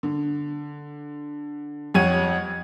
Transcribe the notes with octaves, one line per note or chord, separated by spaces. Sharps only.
D3
F2 G4 C#5 F#5 G#6 D#7